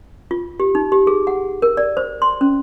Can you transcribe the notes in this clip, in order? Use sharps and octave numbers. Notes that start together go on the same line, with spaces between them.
F4
G4
D#4
G4
G#4
F#5
A#4
D5
C5
C6
C#4